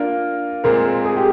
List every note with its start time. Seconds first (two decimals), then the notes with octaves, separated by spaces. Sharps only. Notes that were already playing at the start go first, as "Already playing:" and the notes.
Already playing: A#3 D4 F4 A#4
0.64 A#2 G#3 C4 A#4
1.05 G#4
1.16 G4